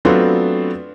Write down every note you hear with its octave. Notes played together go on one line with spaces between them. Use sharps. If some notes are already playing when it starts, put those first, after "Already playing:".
F#3 A3 B3 C4 D4 F4